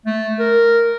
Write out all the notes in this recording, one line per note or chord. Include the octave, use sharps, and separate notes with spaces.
A3
A#4